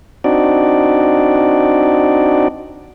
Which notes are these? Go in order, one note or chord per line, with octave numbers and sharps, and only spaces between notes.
C4 D4 D#4 F#4 D5